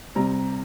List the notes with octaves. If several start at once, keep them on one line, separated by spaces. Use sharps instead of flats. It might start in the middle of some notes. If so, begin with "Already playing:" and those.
C3 G3 C4 A#5